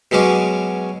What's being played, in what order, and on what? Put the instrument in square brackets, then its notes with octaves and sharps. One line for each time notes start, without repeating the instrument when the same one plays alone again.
[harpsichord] B2 F#3 G#3 C#4 D6